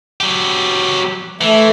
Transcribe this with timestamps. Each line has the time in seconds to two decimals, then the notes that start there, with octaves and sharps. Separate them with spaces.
0.20 F#3 G4
1.41 E3 A3